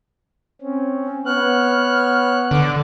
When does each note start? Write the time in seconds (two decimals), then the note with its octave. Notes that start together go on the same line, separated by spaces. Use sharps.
0.62 C4 C#4
1.26 B3 C#5 F6 F#6
2.51 D3 D6